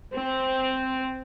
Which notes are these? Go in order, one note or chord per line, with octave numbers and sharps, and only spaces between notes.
C4